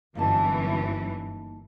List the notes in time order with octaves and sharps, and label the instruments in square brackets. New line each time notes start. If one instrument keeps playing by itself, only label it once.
[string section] G1 F#2 E3 [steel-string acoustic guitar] A#3 D#4 A5